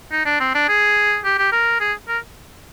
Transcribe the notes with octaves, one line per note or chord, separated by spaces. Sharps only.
D#4
D4
C4
D4
G#4
G4
G4
A#4
G#4
A#4